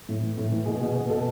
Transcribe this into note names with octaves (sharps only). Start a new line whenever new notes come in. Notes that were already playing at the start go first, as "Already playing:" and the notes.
A2
E3
A2
E3
B2 G#4
B2
B2
B2 A4